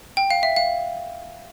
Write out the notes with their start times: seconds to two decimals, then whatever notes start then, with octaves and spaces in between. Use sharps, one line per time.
0.17 G5
0.31 F5
0.43 E5
0.56 F5